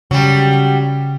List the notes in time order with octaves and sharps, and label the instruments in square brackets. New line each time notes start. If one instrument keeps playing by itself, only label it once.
[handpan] C#3 [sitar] F#3 G3